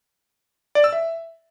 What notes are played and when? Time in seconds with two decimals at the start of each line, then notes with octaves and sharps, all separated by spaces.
0.75 D5
0.84 E6
0.93 E5